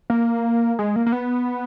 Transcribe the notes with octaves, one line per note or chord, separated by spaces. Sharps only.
A#3
G#3
A#3
A#3
B3